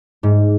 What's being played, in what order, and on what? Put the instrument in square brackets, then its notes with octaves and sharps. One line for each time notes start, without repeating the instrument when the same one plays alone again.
[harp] G#2